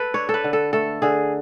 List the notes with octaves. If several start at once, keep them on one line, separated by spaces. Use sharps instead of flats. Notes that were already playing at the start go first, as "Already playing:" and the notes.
Already playing: A4 B4
D4 C#5
A4
B4
D3
A4
A3 A4
D3 G#4